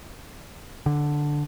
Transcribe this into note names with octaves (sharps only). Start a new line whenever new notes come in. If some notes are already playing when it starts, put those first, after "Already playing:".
D3